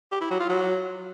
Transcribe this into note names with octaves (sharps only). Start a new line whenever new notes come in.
G4
E4
F#3
F4
F#3